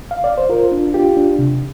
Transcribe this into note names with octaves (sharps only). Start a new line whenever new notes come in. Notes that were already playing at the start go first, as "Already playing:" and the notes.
F5
D5
C5
F4 A#4
D4
F4 G4
D4
C3